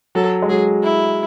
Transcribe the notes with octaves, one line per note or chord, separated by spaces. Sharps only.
F#3 A4
G#3
F#3 G#4
E4